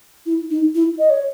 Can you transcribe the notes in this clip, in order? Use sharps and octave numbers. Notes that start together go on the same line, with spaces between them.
E4
D#4
E4
D#5
C#5